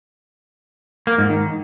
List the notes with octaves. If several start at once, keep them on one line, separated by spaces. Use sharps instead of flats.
A#3
G#2
D#3